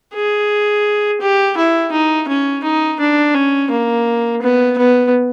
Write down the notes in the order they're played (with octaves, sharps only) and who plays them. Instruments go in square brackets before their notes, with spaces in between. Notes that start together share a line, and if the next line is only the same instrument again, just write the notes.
[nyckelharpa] G#4
G4
E4
D#4
C#4
D#4
D4
C#4
A#3
B3
B3